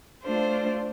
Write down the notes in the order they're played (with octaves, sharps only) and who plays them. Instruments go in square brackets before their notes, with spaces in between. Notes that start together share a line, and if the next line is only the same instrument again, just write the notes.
[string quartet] A3 D4 F4 C5